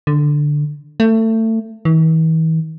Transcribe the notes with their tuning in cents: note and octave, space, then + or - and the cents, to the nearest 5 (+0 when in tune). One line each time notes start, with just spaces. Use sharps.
D3 +5
A3 +25
E3 -45